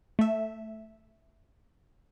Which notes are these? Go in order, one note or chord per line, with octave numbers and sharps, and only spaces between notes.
A3 E5